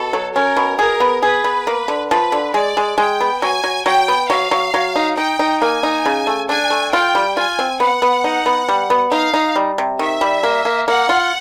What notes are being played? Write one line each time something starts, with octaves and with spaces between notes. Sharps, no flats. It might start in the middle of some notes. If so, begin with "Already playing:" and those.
Already playing: B2 A4
F#3
C#4 A#4
B2
G#4 A#4
B3
G#4 B4
B3
A#3
D3
F3 B4
D3
G#3 D5
G#3
G#3 G5
B3
F#3 G#5
F#3
F#3 G5
B3
F#3 F5
F#3
F#3
D#4
D#4 G5
D#4
A#3 G#5
D#4
C#3
A3
D4 G#5
A3
F4 G5
G3
F4 G#5
C4
B3 F#5
B3
D#4
B3
G3
B3
D#4 F5
D#4
G3
C3
D#3 E5
G3
A#3
A#3
A#3 F#5
F4